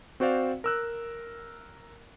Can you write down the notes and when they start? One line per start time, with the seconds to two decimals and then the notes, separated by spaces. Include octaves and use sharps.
0.20 C4 F#4 C5 D5 F5
0.64 A#4 E6 F#6